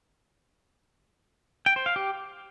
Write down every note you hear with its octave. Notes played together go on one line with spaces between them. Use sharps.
G5
C5
F5
G4